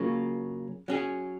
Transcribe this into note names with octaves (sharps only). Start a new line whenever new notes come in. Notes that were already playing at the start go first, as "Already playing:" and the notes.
Already playing: C#3 F#3 A#3 F4
F#3 C#4 G#4